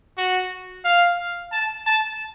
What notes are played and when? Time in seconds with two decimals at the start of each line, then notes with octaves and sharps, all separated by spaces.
0.18 F#4
0.85 F5
1.52 A5
1.87 A5